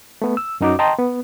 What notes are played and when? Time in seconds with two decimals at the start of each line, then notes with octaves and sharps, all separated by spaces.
0.22 A3 B3
0.37 E6
0.61 F#2 C#4 D#4 F#4 D6
0.79 D#5 G5 A5 A#5 C6
0.99 B3